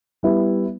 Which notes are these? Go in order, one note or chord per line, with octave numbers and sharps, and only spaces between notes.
G3 B3 E4